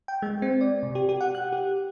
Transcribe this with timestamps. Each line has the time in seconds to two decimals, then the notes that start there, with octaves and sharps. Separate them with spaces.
0.08 G5
0.22 G#3
0.42 C4
0.61 D5
0.83 C3
0.95 G4
1.09 G4
1.21 F#5
1.35 F#6
1.53 G4